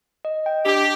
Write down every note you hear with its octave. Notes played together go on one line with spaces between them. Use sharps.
D#5
G5
D4 G4